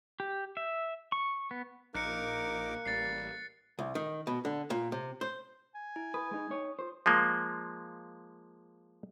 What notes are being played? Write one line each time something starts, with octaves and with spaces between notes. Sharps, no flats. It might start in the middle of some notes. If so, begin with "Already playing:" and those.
G4
E5
C#6
B3
A#1 A#3 D#4 A#4 D6 F#6 C#7
A1 G3 A6 C7
C2
D#3
B2
D3
A#2
C3
C5
G#5
E4
B4 D#6
G#3 D#4
D#4 C#5
F4 C5
F3 G#3 A#3